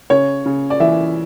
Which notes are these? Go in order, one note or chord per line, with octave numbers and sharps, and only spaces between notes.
C#3 C#5
C#3
D5
E3 E5